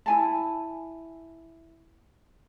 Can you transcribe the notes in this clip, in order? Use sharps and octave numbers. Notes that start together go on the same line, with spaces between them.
E4 G#5 A5